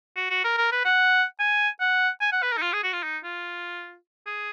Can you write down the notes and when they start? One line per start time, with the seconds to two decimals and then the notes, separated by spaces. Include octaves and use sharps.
0.16 F#4
0.31 F#4
0.44 A#4
0.58 A#4
0.72 B4
0.85 F#5
1.40 G#5
1.80 F#5
2.21 G#5
2.32 F#5
2.42 B4
2.52 A#4
2.57 D#4
2.62 F4
2.73 G#4
2.84 F#4
2.93 F4
3.04 D#4
3.24 F4
4.27 G#4